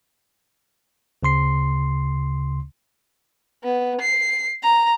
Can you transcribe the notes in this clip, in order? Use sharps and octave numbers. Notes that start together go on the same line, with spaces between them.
D2 C#3 C6 C7
B3
C7
A#5